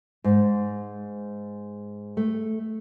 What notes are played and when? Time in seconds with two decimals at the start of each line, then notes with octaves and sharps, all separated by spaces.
0.24 G#2
2.17 A3